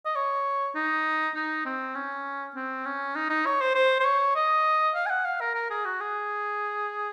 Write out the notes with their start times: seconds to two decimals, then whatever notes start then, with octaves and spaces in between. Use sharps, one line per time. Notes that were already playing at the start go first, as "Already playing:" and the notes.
0.06 D#5
0.15 C#5
0.75 D#4
1.35 D#4
1.66 C4
1.95 C#4
2.55 C4
2.85 C#4
3.16 D#4
3.30 D#4
3.46 C#5
3.61 C5
3.75 C5
4.00 C5
4.05 C#5
4.36 D#5
4.95 F5
5.06 G#5
5.10 F#5
5.25 F5
5.41 A#4
5.55 A#4
5.71 G#4
5.85 F#4
6.00 G#4